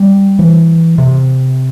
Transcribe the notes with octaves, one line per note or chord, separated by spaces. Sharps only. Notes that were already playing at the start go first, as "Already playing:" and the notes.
Already playing: G3
E3
C3